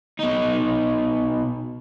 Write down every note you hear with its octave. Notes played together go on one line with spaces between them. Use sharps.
B2 D#4